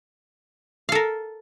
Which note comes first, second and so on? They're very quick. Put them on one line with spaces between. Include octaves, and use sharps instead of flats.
F5 A4 A#4